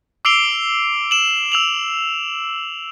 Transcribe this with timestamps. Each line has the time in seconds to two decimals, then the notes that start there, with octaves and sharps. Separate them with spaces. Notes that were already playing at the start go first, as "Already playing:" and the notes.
0.25 D6 E6 C7 D7 F7 G7
1.11 E7 F#7
1.52 E6 F7 F#7